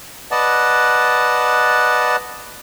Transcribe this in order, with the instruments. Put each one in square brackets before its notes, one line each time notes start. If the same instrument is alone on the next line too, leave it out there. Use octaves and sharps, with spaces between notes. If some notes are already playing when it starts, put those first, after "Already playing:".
[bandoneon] B4 D5 D#5 F#5 A5